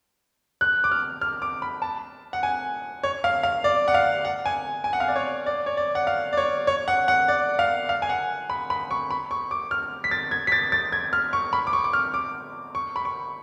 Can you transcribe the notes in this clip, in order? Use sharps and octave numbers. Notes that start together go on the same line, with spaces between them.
F#6
D6
F6
F6
D6
B5
A5
F#5
G#5
C#5
F5
F5
D5
F#5
F5
F#5
G#5
G#5
F#5
F5
D5
C#5
D5
C#5
D5
F#5
F5
D5
C#5
C#5
F#5
F#5
D5
F5
F5
G#5
F#5
B5
B5
C#6
B5
C#6
D6
F6
B6
A6
G#6
B6
A6
A6
G#6
F6
C#6
B5
D6
C#6
D6
F6
D6
C#6
B5
C#6